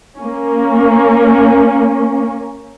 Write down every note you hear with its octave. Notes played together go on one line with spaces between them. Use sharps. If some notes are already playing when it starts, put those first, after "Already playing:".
A#3 C#4